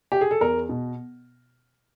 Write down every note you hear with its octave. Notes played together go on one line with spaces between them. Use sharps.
G4
G#4
A4
E2 A#4
B2